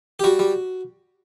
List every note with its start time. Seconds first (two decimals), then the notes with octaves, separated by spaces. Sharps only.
0.19 G4
0.24 G3 F#4
0.39 G3